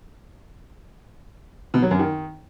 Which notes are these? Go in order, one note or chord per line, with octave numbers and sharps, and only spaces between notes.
B2
F#3
F#2
D#3